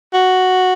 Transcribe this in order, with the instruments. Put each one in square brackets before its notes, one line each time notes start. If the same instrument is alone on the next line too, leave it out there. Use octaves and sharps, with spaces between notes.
[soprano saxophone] F#4